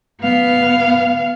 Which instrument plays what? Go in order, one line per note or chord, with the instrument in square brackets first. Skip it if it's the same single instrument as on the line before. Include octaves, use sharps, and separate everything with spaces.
[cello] B3 F5